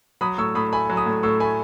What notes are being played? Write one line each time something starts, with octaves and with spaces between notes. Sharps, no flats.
F#3 B5 D#6
A2 C#6 E6
A2 B5 D#6
A3 G#5 B5
F#3
B5 D#6
A2
A2 C#6 E6
A3 G#5 B5